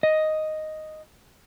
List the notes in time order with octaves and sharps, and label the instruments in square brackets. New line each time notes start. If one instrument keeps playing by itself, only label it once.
[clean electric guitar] D#5